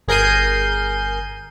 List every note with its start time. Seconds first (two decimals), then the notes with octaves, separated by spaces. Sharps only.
0.08 G1 G#4 A#4 G6 C7 D#7